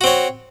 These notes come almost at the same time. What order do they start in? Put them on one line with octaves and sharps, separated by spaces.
F#4 C4 C#5